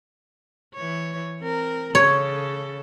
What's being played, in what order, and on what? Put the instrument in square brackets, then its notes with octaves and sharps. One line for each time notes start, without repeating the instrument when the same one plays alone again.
[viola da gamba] E3 C#5
C4 A#4
[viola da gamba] C#3 A4 [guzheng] C#5